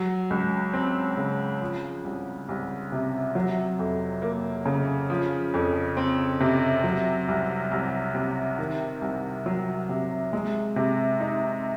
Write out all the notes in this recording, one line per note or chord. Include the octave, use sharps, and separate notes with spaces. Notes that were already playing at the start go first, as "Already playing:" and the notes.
Already playing: F#3
C#2
C4
C#3
F3
C2
C2
C3
F#3
F2
A#3
C#3
F3
F2
C4
C3
F#3
C2
C2
C3
D#3
C2
F#3
C3
G#3
C3
D#4